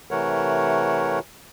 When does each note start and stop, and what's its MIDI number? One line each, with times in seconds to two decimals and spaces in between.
0.11 1.19 48
0.11 1.19 52
0.11 1.19 57
0.11 1.19 70
0.11 1.19 73
0.11 1.19 78